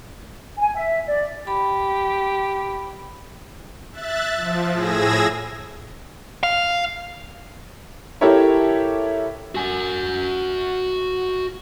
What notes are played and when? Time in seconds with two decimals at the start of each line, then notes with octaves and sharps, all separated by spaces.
0.58 G#5
0.75 E5
1.06 D5
1.47 G4 B5
3.92 E5 F#6 A6
4.37 F3
4.73 A2 G#4 E6 G#6 A#6
6.43 F5
8.21 E4 G4 A4 A#4 C#5 E5
9.55 F#4 G#5